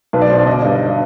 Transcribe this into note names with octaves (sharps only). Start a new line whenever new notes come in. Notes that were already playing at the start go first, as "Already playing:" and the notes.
B1 B4
D5
B2 C5
D5
G1 D#5
G2